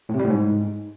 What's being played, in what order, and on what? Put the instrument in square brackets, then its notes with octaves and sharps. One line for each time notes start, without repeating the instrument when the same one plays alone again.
[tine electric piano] A2
C3
G3
A2
G#2